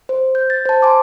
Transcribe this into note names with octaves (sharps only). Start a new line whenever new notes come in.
C5
G6
A6
C5 A5
G#5 C6 D6